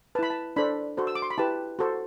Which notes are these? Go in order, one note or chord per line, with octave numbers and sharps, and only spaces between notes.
E4 B4 A5 B5
A5
D4 A4 C5 B5
F#4 A4 C5
E6
D6
C6
B5
E4 G4 B4 A5
F#4 A4 C5